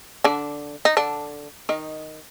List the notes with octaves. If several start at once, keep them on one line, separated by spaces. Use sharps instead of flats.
D3 D4
D#4
D3 D4
D#3 D#4